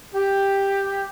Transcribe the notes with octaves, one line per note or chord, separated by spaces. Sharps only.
G4